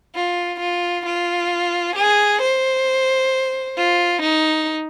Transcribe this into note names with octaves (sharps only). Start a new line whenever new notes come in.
F4
F4
F4
G#4
C5
F4
D#4